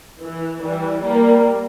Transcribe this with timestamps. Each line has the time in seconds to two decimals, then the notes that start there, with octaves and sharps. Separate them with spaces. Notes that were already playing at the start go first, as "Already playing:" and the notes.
0.21 E3
0.62 E3 G3
1.02 G3 A#3